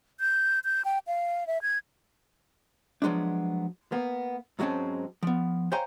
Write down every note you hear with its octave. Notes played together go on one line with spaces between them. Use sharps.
G6
G6
G5
F5
E5
G#6
F3 F#3 G#3 B3 D4
A#3 B3
G#2 F#3 G#3 C4 C#4 A5
F3 B3
C5 C#5 F5 G5 G#5 A#5